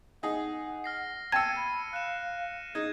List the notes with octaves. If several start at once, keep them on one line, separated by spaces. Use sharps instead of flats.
D#4 G#4 F#5
F6 A#6 C7
G5 A5 E6 G#6 C#7 D#7
B5
F5 F#6 E7
D#4 G#4 G#6